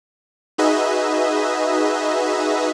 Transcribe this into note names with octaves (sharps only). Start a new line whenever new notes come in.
D#4 F#4 G#4 B4 D#5 E5